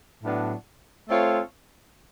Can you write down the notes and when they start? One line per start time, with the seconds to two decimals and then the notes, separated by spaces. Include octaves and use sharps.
0.23 A2 F#3 B3 D4
1.09 A3 C4 F4 A4 C#5